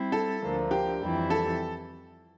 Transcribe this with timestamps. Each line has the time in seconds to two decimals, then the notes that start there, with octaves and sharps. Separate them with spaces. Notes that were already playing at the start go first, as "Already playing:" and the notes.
Already playing: G3 C4 E4
0.12 A4
0.41 D2 D3 F3 A#3
0.71 G4
1.01 F2 E3 G3 C4 E4
1.30 A4